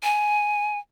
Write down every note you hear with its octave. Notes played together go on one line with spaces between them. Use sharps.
G#5